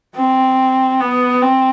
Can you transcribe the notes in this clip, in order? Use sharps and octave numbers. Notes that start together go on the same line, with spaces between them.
C4
B3
C4